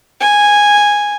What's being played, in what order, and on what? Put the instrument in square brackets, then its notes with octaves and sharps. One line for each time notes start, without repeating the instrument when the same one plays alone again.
[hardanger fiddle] G#5